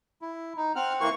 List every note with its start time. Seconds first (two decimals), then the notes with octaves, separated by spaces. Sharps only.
0.22 E4
0.57 D#4
0.76 C4 F#5 F6
1.01 E3 A#3 C#6